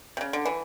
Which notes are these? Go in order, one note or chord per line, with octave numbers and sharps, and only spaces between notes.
C3
C#3
D3
E3